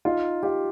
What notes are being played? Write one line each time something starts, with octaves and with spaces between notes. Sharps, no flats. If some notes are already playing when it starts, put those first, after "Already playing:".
D#4 F4
F4 G4